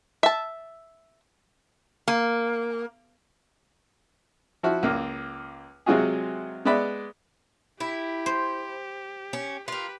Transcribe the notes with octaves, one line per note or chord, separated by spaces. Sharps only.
E5 A5
A#3
F3 E4 F#4
C#2 A#3
C3 F#3 G#3 F4 F#4 G#4
G#3 B3 D5 E5 B5
E4 G4
C5
C#4
F4 G4 A#4 B4